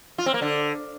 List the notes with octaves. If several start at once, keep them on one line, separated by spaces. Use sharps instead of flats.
F4
C4
A#3
D3